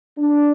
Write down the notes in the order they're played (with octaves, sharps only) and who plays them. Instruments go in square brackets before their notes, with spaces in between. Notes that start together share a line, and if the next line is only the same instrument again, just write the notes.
[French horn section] D4